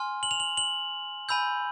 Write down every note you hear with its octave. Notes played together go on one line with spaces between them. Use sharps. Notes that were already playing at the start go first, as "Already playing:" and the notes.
Already playing: G#5 C6 F6
F#7
F7
F#7
F#7
G#5 B5 E6 G6